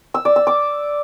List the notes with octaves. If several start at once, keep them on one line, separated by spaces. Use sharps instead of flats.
E6
D5
E6
D6